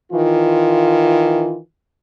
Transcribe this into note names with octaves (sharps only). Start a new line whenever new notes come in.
D#3 E3 F4